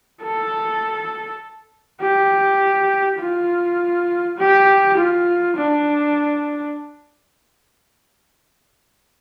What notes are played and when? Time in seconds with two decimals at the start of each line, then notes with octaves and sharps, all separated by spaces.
0.23 A4
2.01 G4
3.19 F4
4.38 G4
4.97 F4
5.56 D4